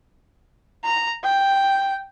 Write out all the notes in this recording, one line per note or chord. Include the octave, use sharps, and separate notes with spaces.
A#5
G5